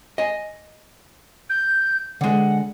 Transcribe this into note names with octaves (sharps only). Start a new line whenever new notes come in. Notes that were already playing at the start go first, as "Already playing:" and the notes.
D#5 G#5
G6
D3 G#3 F#5